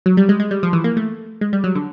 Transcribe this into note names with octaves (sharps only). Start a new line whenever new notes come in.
F#3
G3
G#3
G#3
G3
F3
E3
A#3
A3
G#3
G3
F#3
D3